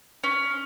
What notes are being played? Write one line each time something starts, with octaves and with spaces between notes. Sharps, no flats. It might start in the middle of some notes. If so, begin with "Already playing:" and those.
C#4